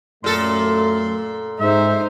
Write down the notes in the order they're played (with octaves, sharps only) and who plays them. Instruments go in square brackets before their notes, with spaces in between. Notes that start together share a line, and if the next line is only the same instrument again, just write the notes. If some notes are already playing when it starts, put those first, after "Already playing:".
[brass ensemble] F#2 A3 [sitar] A#2 A4 [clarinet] C6
[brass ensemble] G#2 G#3 [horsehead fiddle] D#4 C5 [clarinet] E5